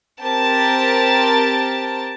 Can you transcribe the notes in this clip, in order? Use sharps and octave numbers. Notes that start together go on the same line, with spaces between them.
C4 G4 A#4 A5